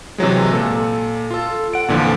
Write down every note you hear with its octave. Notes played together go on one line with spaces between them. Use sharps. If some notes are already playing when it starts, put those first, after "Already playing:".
C3 E3 F#3 G#3
A#2 A4
F4 A4
F#5 D7
F2 A#2 D3 E3 F3